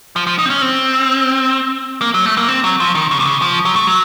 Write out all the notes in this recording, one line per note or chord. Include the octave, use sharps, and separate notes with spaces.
F3
F3
D#4
C4
C#4
C4
A#3
F#3
A3
A#3
C4
F#3
F3
D#3
C#3
C3
C#3
F3
F#3
A3
F#3